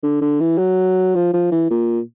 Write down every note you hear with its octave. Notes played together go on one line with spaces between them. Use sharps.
D3
D3
E3
F#3
F3
F3
E3
A#2